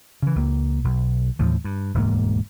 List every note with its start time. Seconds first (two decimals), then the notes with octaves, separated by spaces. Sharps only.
0.22 C#3 E3
0.36 C#2 A#3
0.84 B1
1.39 D#2 A2 E3 F3
1.64 G2
1.94 E1 D2 G#2 A#3